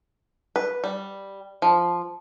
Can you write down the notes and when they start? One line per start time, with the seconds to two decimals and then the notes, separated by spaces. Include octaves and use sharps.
0.56 B4
0.84 G3
1.62 F3